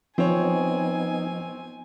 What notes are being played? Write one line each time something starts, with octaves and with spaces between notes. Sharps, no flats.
F3 B3 C4 D#4 C#5 G#5